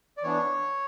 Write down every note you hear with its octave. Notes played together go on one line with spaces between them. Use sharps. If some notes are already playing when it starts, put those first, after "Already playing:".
D5
E3 B3 D4 C#5